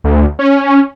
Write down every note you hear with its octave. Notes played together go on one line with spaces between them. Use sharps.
D2
C#4